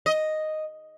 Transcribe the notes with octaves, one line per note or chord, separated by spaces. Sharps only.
D#5